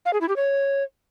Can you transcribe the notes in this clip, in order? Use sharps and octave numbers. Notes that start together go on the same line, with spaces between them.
F5
G#4
E4
G4
C#5